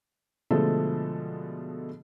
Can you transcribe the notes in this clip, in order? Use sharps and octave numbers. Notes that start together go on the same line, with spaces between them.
B2 D3 F3 G#3 A3 A4